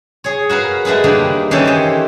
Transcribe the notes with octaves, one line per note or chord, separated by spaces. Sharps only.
G#4 C#5
F#4 A#4 B4 F5
G#3 A3 F#4 G#4 B4
D#3 G3 A#3 D4
D#3 E3 C#4 G4 A4 C#5
G4 C5